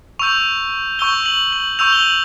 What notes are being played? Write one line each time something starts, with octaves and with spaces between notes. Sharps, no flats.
C#6 E6 G6 F7
C#6 E6 G6 G7
F#7
F#7
C#6 E6 G6 F7
G7
F#7